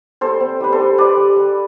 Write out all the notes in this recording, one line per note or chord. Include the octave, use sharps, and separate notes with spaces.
G3 A4 C5
C4
G3 B4
A4 C5
G3
G3 B4 D5
G3
G3